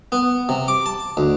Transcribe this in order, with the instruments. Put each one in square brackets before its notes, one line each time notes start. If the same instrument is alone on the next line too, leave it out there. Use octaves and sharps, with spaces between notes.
[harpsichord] B3
C3
D6
A5
D2